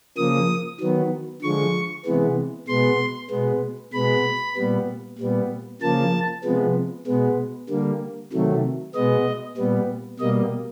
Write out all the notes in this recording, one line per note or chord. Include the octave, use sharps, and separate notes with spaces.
C#3 F3 A#3 D#6
D#3 F#3 B3
D3 F3 G#3 C#6
C3 E3 G#3 B3
B2 G#3 B3 C6
B2 G#3 B3
B2 G#3 B3 B5
A#2 G3 B3
A#2 G3 B3
C#3 F3 A#3 A5
C3 F3 G#3 B3
B2 G#3 B3
D3 G3 A#3
C3 D#3 F#3 A3
B2 G#3 B3 D#5
A#2 G3 B3
B2 G3 A#3 D#5